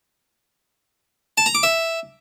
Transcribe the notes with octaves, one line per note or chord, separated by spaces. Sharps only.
A5
A#5
D6
E5